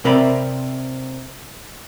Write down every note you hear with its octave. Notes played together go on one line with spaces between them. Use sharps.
C3 C4 A#4 D5 E5 B5